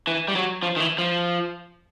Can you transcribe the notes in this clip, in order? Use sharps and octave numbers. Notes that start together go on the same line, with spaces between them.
E3
G3
F#3
F3
D#3
E3
F3